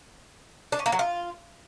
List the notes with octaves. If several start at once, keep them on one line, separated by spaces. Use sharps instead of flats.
D4
C#4
A#3
F#3
F4